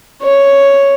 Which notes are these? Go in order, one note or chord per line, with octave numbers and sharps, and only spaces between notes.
C#5